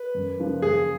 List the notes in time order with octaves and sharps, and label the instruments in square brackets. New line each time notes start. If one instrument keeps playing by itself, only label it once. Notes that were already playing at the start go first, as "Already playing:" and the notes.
Already playing: [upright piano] B4
[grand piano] F#2
C#3 F3 A#3
[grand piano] F#2 [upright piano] G#4